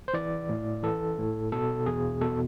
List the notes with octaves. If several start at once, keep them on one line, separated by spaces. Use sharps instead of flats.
C5
E3 D5
A2
E3 A4
A2
B2 A4
E2 G#4
B2 A4